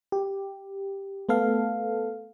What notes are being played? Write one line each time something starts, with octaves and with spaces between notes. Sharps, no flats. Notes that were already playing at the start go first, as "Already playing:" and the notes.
G4
A3 B3 A4 F5